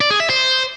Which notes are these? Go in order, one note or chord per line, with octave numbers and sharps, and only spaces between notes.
D5
G#4
E5
C5